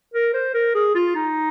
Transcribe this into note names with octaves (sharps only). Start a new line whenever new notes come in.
A#4
C5
A#4
G#4
F4
D#4